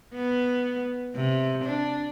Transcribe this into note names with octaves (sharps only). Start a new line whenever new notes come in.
B3
C3
D4